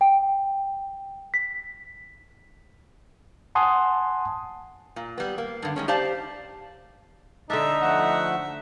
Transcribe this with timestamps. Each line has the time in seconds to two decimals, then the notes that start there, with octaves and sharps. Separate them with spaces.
0.01 G5
1.34 B6
3.55 F#5 G#5 A5 C6 D#6
4.96 A#2
5.18 G3 B3
5.38 A#3
5.62 G2 D3
5.76 D#3 G#3 C#4
5.88 G4 C5 D5 F5 A5
7.50 D3 D4 D#4 E5
7.82 F3 A3 E5 F#5